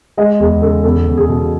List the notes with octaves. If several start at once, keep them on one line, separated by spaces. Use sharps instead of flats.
G#3 D#5
E2 G#4
C#3 A4
E2 A4
E2
G#4
B2